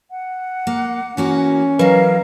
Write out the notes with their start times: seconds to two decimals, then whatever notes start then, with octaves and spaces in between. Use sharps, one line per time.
0.10 F#5
0.67 A#3
1.17 E3 A#3 C#4 F#4
1.79 E3 F#3 A#4 B4 D#5 F5